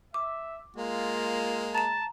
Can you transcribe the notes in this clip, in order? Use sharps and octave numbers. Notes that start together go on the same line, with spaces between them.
E5 D6
G#3 A#3 F4
A5 A#5 E7